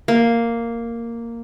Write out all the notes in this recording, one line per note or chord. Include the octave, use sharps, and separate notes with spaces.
A#3